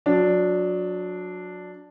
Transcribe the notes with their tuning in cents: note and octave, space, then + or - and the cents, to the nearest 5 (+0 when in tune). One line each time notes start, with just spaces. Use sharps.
F#3 -25 D4 +0